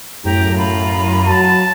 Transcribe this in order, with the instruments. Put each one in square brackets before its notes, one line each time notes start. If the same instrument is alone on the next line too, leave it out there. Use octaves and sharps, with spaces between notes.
[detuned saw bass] F#2 [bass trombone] A2 [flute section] G4 G5 A#5
[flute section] F4 A#5 B5
[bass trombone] F#3 [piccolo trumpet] A5